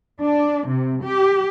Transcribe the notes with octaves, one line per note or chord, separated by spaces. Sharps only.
D4
C3
G4